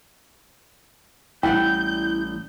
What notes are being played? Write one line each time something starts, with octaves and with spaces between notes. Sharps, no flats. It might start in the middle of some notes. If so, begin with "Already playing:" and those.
A1 G3 E4 D5 F#5 G5 G6